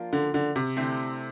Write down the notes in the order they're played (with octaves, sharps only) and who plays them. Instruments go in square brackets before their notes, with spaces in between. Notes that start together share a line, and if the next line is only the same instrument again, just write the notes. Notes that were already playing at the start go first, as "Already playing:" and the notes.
Already playing: [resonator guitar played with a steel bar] F3 A#3 D4 F4
[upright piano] D3
D3
C3
[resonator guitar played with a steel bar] D3 A3 C4 E4 G4